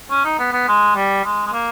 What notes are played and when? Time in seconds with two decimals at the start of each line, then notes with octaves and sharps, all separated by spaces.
0.10 C#4
0.25 D#4
0.39 B3
0.53 B3
0.68 G#3
0.96 G3
1.25 G#3
1.47 G#3
1.53 A#3